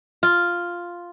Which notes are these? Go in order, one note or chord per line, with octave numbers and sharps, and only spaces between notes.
F4